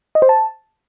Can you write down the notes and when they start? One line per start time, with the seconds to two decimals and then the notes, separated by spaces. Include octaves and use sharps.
0.15 D#5
0.22 C5
0.29 A5